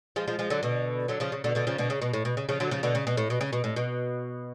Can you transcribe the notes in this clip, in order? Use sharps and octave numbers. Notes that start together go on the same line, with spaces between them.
F3 G#3
F3 G#3
F3 G#3
D3 F#3
B2 D3
D3 F#3
C#3 F3
C#3
B2 D3
B2 D3
C#3 F3
B2 D3
C#3
B2
A2
B2
C#3
C#3 F3
D3 F#3
C#3 F3
B2 D3
C#3
B2
A2
B2
C#3
B2
A2
B2